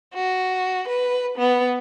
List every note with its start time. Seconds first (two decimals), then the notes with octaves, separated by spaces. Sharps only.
0.15 F#4
0.88 B4
1.38 B3